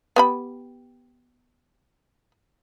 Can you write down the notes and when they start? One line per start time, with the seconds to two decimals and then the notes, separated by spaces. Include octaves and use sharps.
0.16 B3 G4 B5